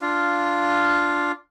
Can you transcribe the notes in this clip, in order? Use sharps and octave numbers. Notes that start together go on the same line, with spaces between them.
D4 F4 F5